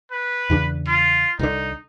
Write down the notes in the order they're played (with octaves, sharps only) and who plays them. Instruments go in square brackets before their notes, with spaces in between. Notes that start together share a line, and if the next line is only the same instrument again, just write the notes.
[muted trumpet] B4
[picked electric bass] E2 C#3 D4
[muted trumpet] F4
[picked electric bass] C2 D3 [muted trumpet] D#4